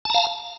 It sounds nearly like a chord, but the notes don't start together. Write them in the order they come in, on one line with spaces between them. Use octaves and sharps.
A5 A#5 F5